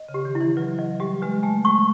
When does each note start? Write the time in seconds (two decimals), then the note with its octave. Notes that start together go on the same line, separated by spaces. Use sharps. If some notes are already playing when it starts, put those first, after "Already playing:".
Already playing: D#5
0.08 C#3
0.14 G4
0.25 D#3
0.35 E4
0.41 E3
0.57 F#3 B4
0.78 F#3 D#5
1.00 G3 G4
1.22 G#3 B4
1.43 A3 G#5
1.65 G#3 C#6